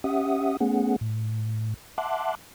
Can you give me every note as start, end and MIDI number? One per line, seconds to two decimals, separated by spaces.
0.04 0.57 61
0.04 0.57 67
0.04 0.57 76
0.04 0.57 78
0.04 0.57 87
0.60 0.96 57
0.60 0.96 59
0.60 0.96 61
0.60 0.96 68
0.60 0.96 78
1.01 1.74 45
1.98 2.35 76
1.98 2.35 78
1.98 2.35 81
1.98 2.35 84
1.98 2.35 86
1.98 2.35 90